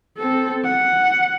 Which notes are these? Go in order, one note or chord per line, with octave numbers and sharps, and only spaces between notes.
C4 A4
F#5